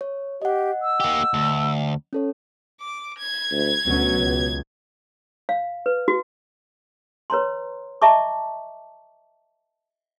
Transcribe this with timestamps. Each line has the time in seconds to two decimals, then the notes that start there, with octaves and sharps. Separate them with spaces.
0.01 C#5
0.42 G4 D#5 F#5
0.83 E6
1.00 A#3 G4
1.34 D2
2.13 C#4 A4 C#5
2.81 D6
3.19 G#6
3.51 D2
3.87 D2 B2 F#3 C#4
4.19 C#2
5.49 F5
5.86 B4
6.08 F#4
7.30 B4 C#5 A#5 C6
8.02 D#5 E5 A5 A#5 C#6 D6